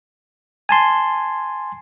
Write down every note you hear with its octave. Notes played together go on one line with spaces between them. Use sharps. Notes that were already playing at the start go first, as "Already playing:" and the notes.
G#5 A5 C6